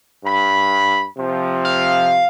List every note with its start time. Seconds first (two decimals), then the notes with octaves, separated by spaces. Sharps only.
0.25 G2 B5
1.18 C3 F3
1.65 F5